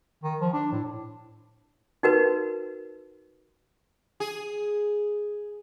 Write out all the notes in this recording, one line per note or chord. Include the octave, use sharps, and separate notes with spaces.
D#3
F3
D4
A2
D#4 F#4 A#4 B4
G#4